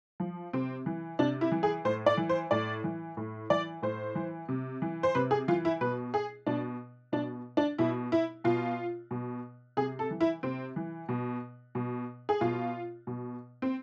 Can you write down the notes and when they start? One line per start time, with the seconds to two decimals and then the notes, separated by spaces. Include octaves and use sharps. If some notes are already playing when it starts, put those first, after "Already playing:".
0.20 F3
0.53 C3 C4
0.86 E3
1.19 C3 D4
1.41 E4
1.52 E3
1.63 G#4
1.85 A2 C5
2.06 D5
2.17 E3
2.29 C5
2.51 A2 D5
2.84 E3
3.17 A2
3.50 E3 D5
3.82 A2 C5
4.15 E3
4.49 C3
4.82 E3
5.03 C5
5.15 C3 B4
5.31 G#4
5.48 E3 F4
5.65 E4
5.81 B2 B4
6.14 G#4
6.46 B2 D4
7.12 B2 D4
7.57 D4
7.78 B2 E4
8.12 E4
8.44 B2 F4
9.11 B2
9.77 C3 G#4
9.99 A4
10.10 E3
10.21 E4
10.43 C3 C4
10.76 E3
11.09 B2
11.75 B2
12.29 G#4
12.41 B2 F4
13.07 B2
13.62 C4